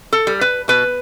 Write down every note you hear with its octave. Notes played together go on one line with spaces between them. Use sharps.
A4
G3
B4
B2 B4